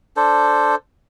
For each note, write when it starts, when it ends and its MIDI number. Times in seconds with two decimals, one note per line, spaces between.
0.17 0.75 62
0.17 0.75 69
0.17 0.75 72